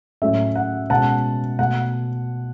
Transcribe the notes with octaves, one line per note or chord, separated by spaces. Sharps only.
A2 F#3 A3 C#4 E5
F#5
B2 G#3 C#4 F#5 A5
B2 A3 F#5